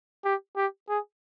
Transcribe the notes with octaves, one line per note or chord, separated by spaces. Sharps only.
G4
G4
G#4